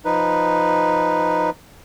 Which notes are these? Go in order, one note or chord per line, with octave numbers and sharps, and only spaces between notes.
F3 D#4 B4